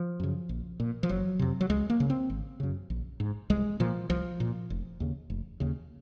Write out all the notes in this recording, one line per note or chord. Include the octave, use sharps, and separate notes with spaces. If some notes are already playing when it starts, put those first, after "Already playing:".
Already playing: F3
F#2 C#3
A#1
A#2
F3
F#1 F#3
F2 C3
F#3
C#2 G#3
A#3
C#3
C4
G#1
F#2 C#3
A#1
G#2
C2 G#3
A#2 F3
C2 F3
A#2
F1
D#2 C#3
F1
D#2 C#3